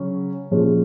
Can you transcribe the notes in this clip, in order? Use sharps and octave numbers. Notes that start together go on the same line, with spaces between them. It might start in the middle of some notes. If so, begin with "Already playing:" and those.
Already playing: C#3 F#3 C#4
A#2 F3 G#3 C#4